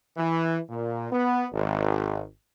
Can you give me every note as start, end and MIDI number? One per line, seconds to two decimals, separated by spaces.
0.17 0.58 52
0.70 1.07 46
1.11 1.44 59
1.53 2.23 32